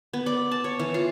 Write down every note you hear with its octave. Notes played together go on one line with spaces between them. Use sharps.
B3
D5
A5
C#5
E3
F4